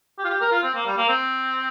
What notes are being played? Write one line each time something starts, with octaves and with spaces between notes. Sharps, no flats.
G4
F4
G4
A#4
F4
C4
A#3
G3
A#3
C4